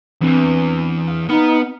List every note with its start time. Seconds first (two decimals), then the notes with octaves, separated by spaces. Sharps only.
0.22 E2 C4 D4 B4
1.07 F5
1.29 B3 D#4 B4 F6